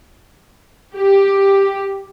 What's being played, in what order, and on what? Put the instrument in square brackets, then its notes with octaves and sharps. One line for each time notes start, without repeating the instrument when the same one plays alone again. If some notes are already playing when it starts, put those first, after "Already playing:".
[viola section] G4